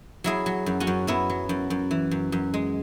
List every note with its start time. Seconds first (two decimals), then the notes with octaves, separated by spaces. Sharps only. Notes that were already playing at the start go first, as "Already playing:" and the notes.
0.24 F#3 E4 G#4
0.46 F#3
0.66 F#2
0.80 C#4 F#4
0.87 F#2
1.07 F#3 B3 E4
1.30 F#3
1.49 F#2
1.70 F#2
1.91 E3
2.11 F#2
2.32 F#2
2.54 G#3